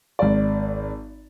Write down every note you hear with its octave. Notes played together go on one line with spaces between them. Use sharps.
G#1 D5